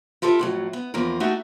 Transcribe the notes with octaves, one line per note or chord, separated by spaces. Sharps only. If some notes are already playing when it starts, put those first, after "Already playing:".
E4 F4 G4 A4 A#4 E5
F2 A2 F#3
B3
E2 F3 A#3 A#4
A3 D#4 F#4 G4 E5